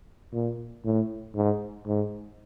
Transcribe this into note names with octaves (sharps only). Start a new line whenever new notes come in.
A#2
A2
G#2
G#2